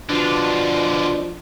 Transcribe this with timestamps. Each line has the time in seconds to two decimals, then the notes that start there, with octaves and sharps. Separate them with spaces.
0.09 B2 D3 F3 D4 F4